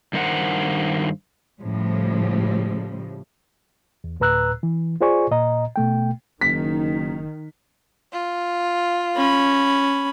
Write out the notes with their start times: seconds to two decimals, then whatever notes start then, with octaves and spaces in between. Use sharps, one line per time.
0.13 G2 D#3 A#4 C5 F#5
1.61 A2 C#3 F3 G3
4.04 E2
4.20 D2 A2 B4 A#5 E6 F#6
4.63 E3
5.01 F4 G#4 C5 D5 G#5 C#6
5.31 A#2 D#5 A#5
5.76 B2 A3 G5
6.41 F#1 D#3 B6
8.13 F4
9.17 C#4 B5